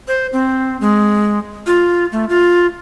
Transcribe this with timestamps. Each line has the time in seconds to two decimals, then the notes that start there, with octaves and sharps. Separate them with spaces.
0.08 C5
0.33 C4
0.81 G#3
1.67 F4
2.12 A3
2.29 F4